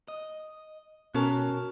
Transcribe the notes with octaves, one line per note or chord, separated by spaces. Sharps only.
D#5
B2 C#4 F#4 A#4 A5